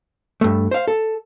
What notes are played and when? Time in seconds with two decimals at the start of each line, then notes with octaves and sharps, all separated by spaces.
0.41 G2 A3
0.71 C5 F5
0.88 A4